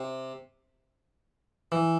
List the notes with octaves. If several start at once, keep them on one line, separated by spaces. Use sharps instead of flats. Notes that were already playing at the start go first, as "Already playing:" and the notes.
Already playing: C3
E3